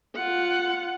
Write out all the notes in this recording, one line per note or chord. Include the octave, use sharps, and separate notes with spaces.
F4 F#5